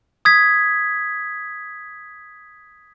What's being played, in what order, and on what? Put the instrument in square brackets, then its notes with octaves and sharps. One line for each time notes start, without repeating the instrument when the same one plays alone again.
[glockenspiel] D#6 G#6 B6